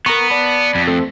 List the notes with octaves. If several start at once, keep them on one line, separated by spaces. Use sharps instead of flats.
B3 A#4 A#5 C#6
D5 A5 B5
F2
A3 C4 A4